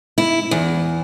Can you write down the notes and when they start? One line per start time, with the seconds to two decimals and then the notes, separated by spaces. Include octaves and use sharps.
0.18 E4
0.51 E2